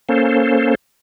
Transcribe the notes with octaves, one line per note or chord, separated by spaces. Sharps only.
A#3 C#4 A4 C5